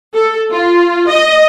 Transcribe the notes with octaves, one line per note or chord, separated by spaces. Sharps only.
A4
F4
D#5